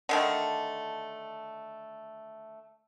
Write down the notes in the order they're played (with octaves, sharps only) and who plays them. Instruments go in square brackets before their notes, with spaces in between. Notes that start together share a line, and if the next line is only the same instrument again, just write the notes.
[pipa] D3 D#3 A3